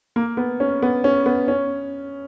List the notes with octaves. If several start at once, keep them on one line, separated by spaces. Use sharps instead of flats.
A#3
B3
C#4
B3
C#4
B3
C#4